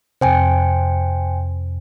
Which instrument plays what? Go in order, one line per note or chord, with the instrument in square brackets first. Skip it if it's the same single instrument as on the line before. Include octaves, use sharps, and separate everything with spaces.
[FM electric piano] F2 C3 [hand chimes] C5 G5 G#5